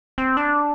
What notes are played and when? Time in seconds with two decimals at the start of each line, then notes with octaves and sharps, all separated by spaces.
0.18 C4
0.37 D4